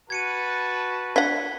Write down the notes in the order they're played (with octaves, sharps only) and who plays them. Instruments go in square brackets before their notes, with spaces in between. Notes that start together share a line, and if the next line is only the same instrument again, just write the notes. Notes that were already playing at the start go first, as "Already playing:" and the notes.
[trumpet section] F#4 B4 A5 [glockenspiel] G#6 C#7 D#7
[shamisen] D4 F#5 [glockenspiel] G#6 B6 G7